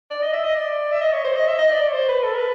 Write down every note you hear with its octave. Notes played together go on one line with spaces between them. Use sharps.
D5
D#5
E5
D#5
D5
E5
D#5
C#5
C5
D#5
E5
D#5
D5
D5
C#5
C5
B4
A4
A#4
B4